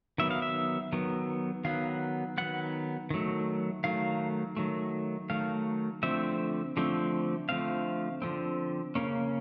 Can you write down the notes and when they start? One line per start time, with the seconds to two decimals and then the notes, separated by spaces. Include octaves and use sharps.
0.18 D#3 F#3 B3 E5
0.31 F5
0.42 E5
0.92 D#3 F#3 B3
1.64 D#3 F#3 B3 F5
2.38 D#3 F#3 B3 F#5
3.10 D#3 F#3 A3
3.84 D#3 F#3 A3 F5
4.57 D#3 F#3 A3
5.30 D#3 F#3 A3 F5
6.03 D3 F3 A3 C4 E5
6.77 D3 F3 A3 C4
7.49 D3 F3 A3 C4 F5
8.22 D3 F3 A3 C4
8.95 C#3 F3 A#3 C#4